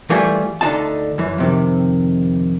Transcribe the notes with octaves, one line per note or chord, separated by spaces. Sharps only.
E3 G3 A3 F4 G4 G#4
D2 D3 D#4 F4 A5
F#2 E3
F2 C3 D#3